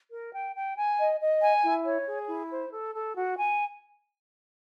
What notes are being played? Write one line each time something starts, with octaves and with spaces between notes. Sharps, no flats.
A#4
G5
G5
G#5
D#5
D#5
G#5
E4
C#5
G#4
E4
C5
A4
A4
F#4
G#5